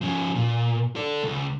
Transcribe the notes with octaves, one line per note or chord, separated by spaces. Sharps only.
F3 C#4
A#2
A4 D5
C#2